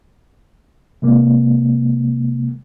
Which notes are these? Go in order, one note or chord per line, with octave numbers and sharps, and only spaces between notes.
C3 G#3 A#3